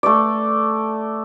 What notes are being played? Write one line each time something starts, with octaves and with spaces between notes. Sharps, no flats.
A3 D5